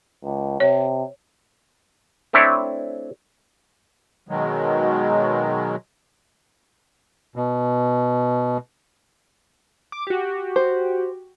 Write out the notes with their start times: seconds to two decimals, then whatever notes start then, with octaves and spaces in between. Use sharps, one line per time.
0.24 C#2
0.60 C3 C#5
2.33 A3 C4 D4 E4 C#5 E5
4.29 B2 D#3 F#3 G#3
7.36 B2
9.92 D6
10.07 F#4 G4
10.56 C5